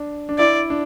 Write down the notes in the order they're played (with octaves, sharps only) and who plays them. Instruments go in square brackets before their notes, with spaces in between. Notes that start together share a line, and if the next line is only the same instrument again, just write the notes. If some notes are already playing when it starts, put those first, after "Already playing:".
Already playing: [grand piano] D4
D4
[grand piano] E4 [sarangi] D5
[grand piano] D4